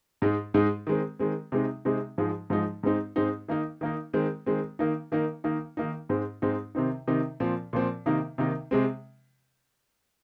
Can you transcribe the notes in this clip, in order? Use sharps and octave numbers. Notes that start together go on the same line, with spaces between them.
G#2 G#3 D#4
G#2 G#3 D#4
D#3 G#3 C4
D#3 G#3 C4
C3 G#3 C4 D#4
C3 G#3 C4 D#4
G#2 F3 G#3 D#4
G#2 F3 G#3 D#4
G#2 G#3 C4 D#4
G#2 G#3 C4 D#4
D#3 A#3 D#4
D#3 A#3 D#4
D#3 G#3 C4
D#3 G#3 C4
D#3 A#3 D#4
D#3 A#3 D#4
D#3 A#3 D#4
D#3 A#3 D#4
G#2 G#3 C4 D#4
G#2 G#3 C4 D#4
C3 D#3 C4 D#4
C3 D#3 C4 D#4
A#2 F3 C4
A#2 F3 C4
C3 D#3 A#3 D#4
C3 D#3 A#3 D#4
C3 G#3 C4